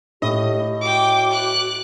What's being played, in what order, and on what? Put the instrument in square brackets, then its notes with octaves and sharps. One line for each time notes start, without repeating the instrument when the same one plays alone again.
[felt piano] A2 [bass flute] G4 [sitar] D#5
[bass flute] F#4 [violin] G5 D6
[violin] D6 F#6